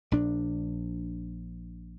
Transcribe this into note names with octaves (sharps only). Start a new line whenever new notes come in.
A#1 D4